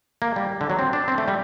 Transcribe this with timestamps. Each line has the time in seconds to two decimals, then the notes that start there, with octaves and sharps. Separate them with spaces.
0.22 A#3
0.36 G3
0.61 D3
0.70 F#3
0.79 C4
0.93 D4
1.08 C4
1.18 A3
1.28 G3